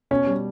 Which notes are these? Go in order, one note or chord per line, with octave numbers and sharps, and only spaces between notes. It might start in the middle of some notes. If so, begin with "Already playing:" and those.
B2 C#4
G3